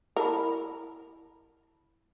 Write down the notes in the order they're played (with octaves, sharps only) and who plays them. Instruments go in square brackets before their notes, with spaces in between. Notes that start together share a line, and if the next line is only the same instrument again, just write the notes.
[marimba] E4 A5 B5 [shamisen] A#4